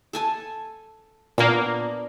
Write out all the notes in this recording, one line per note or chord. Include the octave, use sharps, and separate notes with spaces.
A4 G#5 A5
A#2 A#3 B3 D4